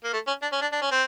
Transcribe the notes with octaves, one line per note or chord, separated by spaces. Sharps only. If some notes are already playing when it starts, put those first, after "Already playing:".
A#3
A3
C#4
D4
C#4
D4
D4
C#4
C4